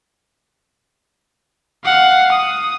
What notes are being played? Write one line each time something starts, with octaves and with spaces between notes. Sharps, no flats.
F5 F#5
D#6